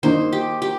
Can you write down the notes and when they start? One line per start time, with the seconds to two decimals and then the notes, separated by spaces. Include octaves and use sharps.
0.03 D#3 A#3 D#4 C5
0.32 G4
0.62 G4